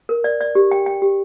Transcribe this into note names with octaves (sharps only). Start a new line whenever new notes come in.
A#4
D5
D5
G4
G5
G5
G4